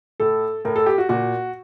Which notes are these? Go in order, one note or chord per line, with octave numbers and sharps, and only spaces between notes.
A2 A4
A2 A#4
A4
G4
F#4
A#2 F#4